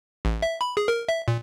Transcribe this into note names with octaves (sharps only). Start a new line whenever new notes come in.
A1
E5
B5
G#4
A#4
E5
A#2